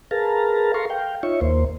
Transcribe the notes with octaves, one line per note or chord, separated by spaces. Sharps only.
G#4 A#4 B4 F5 A5 A#5
A4 F5 A#5 C6 C#6
F5 G5
D#4 F4 C#5 E5 C#6
D#2 A#3 C5